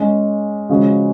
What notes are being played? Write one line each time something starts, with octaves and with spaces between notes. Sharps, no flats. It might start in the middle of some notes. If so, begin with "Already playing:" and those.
Already playing: G#3 C#4 G#4
C#3 F3 G#3 C#4 F#4